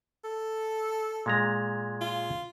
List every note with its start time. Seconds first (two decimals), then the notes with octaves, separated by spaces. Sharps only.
0.24 A4
1.26 A#2 G#3 A#5
2.01 F4